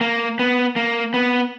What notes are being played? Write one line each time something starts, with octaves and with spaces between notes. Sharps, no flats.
A#3
B3
A#3
B3